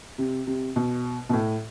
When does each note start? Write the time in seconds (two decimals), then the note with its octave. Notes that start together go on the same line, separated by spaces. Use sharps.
0.18 C3
0.47 C3
0.76 B2
1.29 B2
1.33 A2